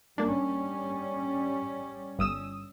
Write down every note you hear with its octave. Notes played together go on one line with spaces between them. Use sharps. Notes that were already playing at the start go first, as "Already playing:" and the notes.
G3 A#3 C#4 D4
G1 D#6 E6